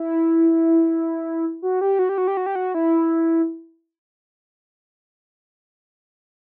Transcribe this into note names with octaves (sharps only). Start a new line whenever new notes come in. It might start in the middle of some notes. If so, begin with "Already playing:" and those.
Already playing: E4
F#4
G4
F#4
G4
F#4
G4
F#4
G4
F#4
E4